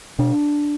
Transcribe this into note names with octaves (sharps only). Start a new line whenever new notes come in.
B2 D4